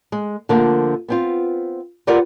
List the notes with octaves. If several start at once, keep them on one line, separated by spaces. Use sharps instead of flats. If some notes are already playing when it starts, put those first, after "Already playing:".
G#3
D3 F3 A3 A#3
B3 C4 F4
F4 G4 A#4 B4 D5 F#5